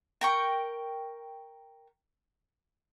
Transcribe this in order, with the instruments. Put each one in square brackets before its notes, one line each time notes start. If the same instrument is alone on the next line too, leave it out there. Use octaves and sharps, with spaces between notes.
[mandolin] A#4 G5 C#6